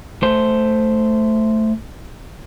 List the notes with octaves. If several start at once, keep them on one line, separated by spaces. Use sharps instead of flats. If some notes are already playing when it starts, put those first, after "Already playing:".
A3 C5